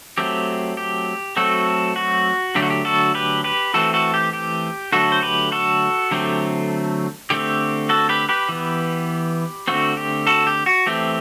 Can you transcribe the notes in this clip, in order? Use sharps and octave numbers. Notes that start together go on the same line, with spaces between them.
F#3 A3 C4 G4
G4
F#3 A3 C4 F#4 A4
F#4
D3 F#3 A3 G4
F#4
G4
F#4 A4
G4 B4
G4 B4
E3 A3 C4 F#4 A4
F#4 A4
G4
G4
D3 F#3 A3 F#4 A4
C5
G4 B4
F#4 A4
D3 F#3 A3 C4 G4
D3 A3 C4 G4
F#4 A4
G4 B4
G4 B4
E3 B3
D3 A3 C4 F#4
G4
F#4 A4
G4
F#4
E3 A3 C4 G4